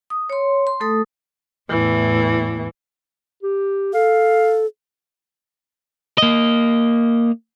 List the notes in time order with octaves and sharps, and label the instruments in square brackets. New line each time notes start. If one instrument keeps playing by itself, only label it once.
[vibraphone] D#6
C#5 C6
C6
A3 A4 D#6
[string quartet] E2 A2 E3
[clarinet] G4
[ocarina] A4 [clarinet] F5
[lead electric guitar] A#3 D#5